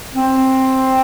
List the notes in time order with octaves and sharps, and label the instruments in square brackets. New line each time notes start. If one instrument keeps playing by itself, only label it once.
[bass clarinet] C4